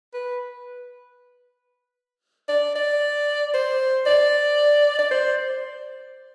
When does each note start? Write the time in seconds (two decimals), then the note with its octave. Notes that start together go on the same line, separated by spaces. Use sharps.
0.14 B4
2.49 D5
2.75 D5
3.54 C5
4.06 D5
4.99 D5
5.11 C5